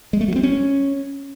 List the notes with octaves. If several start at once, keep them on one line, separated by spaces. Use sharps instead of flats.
G#3
A3
F#3
C4
C#4